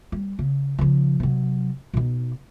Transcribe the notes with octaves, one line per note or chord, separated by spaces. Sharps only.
G3
C#3
C#3 F3
C3 F#3
B2 D#4